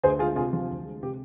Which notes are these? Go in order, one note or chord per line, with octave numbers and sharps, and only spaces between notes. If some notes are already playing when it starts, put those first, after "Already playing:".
D2 G#4 C5
G#3 F4 G#4
C3 F4 G#4
F3 F4
D2
G#3
C3 G4